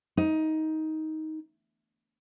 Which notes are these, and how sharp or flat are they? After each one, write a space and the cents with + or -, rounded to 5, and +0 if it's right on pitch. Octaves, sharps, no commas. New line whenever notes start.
D#4 +15